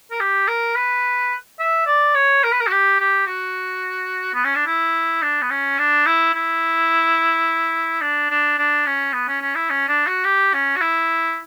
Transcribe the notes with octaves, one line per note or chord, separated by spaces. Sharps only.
A#4
G4
A#4
B4
E5
D5
C#5
A#4
B4
A#4
F#4
G4
G4
F#4
B3
C#4
D4
E4
D4
B3
C#4
D4
E4
E4
D4
D4
D4
C#4
B3
C#4
C#4
E4
C#4
D4
F#4
G4
C#4
F#4
E4